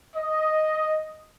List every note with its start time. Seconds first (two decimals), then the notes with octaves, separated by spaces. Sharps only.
0.16 D#5